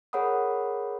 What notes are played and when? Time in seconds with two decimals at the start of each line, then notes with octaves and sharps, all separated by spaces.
0.13 G#4 A#4 C#5 F#5 B5 D#6